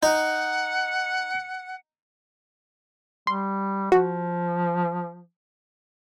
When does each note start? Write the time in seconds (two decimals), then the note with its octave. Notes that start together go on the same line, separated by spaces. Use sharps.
0.03 D#4 F#5
3.27 G3 C6
3.92 F3 F#4